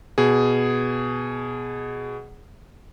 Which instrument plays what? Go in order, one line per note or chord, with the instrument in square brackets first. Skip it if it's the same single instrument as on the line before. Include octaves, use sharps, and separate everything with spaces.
[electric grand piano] B2 G#4